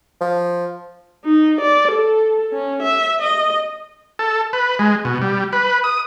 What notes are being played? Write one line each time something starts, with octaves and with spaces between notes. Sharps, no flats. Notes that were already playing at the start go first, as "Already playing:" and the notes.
F3
D#4
D5
A4
C#4
E5
D#5
A4
B4
G#3
B2
G3
B4
D#6